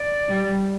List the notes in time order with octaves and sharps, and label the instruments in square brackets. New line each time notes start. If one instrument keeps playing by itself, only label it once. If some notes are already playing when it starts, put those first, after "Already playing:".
Already playing: [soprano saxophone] D5
[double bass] G3